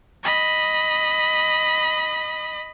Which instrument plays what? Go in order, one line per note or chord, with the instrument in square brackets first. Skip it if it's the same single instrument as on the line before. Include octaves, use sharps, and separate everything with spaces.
[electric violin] D#5 B5